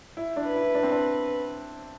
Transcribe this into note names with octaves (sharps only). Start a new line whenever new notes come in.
E4
D4
B4
E4
D4
C4
D4